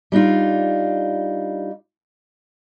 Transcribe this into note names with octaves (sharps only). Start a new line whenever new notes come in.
G3 D4 D#4 F4